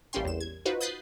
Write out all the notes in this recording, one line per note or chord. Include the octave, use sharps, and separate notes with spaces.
A1 G3 A#3 C#4 G5 C6
E2 E7
G#6
D#4 F4 F#4 B4 C5
D#6 F#6 G6 A6 B6 C7